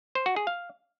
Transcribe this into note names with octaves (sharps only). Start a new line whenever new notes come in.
C5
F#4
G#4
F5